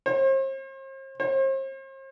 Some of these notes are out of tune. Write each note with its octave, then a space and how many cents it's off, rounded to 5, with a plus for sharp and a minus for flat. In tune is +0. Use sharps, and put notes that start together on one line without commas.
C5 +40
C5 +40